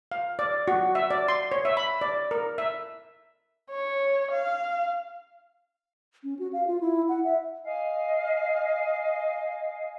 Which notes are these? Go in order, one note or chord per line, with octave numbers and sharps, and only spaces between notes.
F5
D5
F#4
E5
D5
C6
C#5
E5
B5
D5
A#4
E5
C#5
F5
C#4
F#4
F5
F4
E4
F#5
E5
D#5 F5 G#5